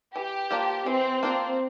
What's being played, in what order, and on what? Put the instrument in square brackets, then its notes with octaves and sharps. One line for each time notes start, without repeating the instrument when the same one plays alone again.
[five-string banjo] E3 [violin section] G4
[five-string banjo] A#3 D4 F4 C5
[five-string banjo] E3 [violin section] C4
[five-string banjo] A#3 D4 F4 C5 [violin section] C4